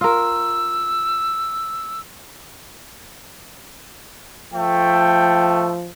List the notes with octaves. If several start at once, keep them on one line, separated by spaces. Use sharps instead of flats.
F4 A#4 E6
F3 A3 G5